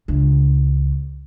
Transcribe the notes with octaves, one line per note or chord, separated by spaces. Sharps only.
C#2 D4